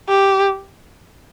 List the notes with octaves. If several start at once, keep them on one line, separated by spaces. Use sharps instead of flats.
G4